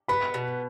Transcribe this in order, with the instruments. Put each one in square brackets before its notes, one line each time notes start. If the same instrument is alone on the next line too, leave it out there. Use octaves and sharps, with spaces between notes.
[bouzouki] B3 [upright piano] B5
[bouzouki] B2